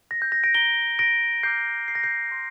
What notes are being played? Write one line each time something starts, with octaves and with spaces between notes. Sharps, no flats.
A#6
G6
A#6
A#6 D7
A#5 G6 D7 G7
A#6 D7
A#5 D6 F6 G6 C7
C7
A#6
G6 C7
C6 G6